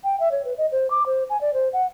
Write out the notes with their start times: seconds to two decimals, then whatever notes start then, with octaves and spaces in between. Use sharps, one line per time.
0.04 G5
0.20 E5
0.32 C#5
0.45 B4
0.58 D#5
0.72 C5
0.90 D6
1.06 C5
1.30 G#5
1.41 D5
1.54 C5
1.73 F#5